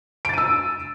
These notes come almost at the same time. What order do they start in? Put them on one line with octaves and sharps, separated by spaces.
D7 A6 D#7 E6